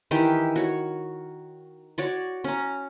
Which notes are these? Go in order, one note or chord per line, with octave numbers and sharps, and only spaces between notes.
D#3 E3 G4
F#4 C#5
F#4 C#5 D5
C#4 A#5